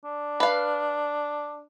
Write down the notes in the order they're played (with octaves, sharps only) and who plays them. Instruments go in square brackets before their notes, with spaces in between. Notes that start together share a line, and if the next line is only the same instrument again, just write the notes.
[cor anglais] D4
[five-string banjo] B4 F5